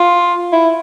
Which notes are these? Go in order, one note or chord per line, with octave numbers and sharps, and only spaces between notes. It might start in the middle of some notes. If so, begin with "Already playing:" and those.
Already playing: F4
E4